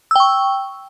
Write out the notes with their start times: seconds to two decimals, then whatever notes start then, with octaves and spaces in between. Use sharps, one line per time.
0.11 E6
0.16 G5
0.20 C#6